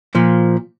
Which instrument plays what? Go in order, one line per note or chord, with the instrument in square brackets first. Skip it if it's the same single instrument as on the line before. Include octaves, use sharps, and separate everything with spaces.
[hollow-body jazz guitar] A#2 F3